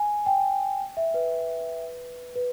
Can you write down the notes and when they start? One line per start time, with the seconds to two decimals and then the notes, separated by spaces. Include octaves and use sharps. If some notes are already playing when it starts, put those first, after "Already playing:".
Already playing: G#5
0.26 G5
0.97 E5
1.14 B4
2.36 B4